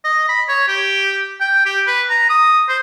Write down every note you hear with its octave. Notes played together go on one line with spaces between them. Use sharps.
D#5
B5
C#5
G4
G5
G4
B4
A#5
D#6
C5